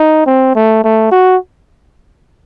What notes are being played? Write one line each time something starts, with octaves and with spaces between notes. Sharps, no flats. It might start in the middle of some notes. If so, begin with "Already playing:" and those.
Already playing: D#4
C4
A3
A3
F#4